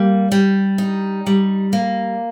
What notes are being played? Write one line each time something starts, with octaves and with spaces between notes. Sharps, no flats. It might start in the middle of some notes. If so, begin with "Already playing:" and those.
Already playing: G3 A#3
G3
D#4
G3
A#3